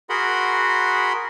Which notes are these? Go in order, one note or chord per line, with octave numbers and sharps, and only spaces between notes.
F#4 G#4 A#4 F#5 B5 C6